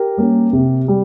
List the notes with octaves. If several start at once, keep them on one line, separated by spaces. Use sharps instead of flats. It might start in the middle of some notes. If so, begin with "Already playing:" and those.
Already playing: G4 A#4
G3 A#3 C#4
C3
G3